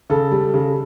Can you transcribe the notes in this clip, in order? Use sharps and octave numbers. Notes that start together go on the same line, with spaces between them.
C#3 A4
G3
C#3